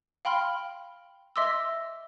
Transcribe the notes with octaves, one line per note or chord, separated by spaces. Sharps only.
F5 G5 B5 C6 F6
D#5 E5 C6 D6 E6